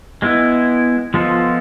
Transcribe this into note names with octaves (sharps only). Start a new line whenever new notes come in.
G#3 B3 E4
F3 G#3 B3 F4 A4